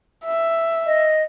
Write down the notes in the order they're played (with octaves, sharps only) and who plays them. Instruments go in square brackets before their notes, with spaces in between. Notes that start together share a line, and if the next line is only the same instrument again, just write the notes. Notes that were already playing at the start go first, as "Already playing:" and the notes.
[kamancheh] E5
[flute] D#5